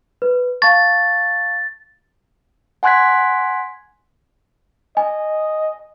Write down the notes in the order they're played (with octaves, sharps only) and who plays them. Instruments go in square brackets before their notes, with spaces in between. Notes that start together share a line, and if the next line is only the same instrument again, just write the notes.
[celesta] B4
[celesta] F5 A5 C#6 [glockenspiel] A6
[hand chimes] F#5 G#5 C6 F#6 G#6 B6
[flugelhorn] D#5 [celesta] G#5